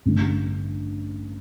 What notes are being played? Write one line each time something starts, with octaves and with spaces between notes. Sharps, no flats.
A1 G2 D3